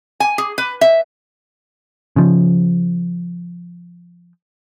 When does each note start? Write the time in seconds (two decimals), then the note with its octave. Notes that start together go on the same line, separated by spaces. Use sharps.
0.20 G#5
0.38 G#4
0.58 B4
0.81 E5
2.16 C#3 F3